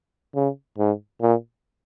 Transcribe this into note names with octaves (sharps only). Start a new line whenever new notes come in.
C#3
G#2
A#2